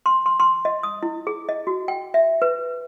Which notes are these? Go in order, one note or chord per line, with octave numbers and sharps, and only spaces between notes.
C6
C6
C6
D#5
D#6
E4
G#4
D#5
F#4
G5
E5
B4